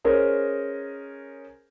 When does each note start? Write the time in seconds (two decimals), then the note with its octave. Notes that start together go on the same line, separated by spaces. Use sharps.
0.05 C#4 G#4 A#4 C5 D#5